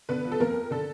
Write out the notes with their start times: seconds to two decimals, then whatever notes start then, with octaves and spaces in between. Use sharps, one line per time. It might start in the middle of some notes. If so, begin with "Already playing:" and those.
0.09 D3 B3 B4
0.25 F3
0.32 A4
0.40 F2 A#3 A#4
0.55 A#3
0.71 D3 A4